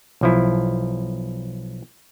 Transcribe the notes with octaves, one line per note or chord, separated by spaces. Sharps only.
B1 F3 E4